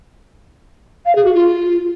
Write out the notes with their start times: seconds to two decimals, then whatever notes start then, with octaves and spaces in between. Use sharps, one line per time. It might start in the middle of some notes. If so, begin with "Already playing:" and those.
1.06 F5
1.15 G#4
1.25 F#4
1.34 F4